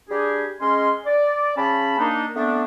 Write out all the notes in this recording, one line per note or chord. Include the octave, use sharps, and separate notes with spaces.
G3 D4 G4 G#4
G#3 C#4 D#5 F5 C6
D5
C#3 C#4 A5 B5
A#3 D4 D#4
A3 B3 C4 D4